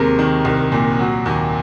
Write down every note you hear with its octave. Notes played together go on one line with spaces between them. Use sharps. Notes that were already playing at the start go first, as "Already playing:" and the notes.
Already playing: D#2 C3 G#3 A#4
D#3
C2
A#2
F#3
D#2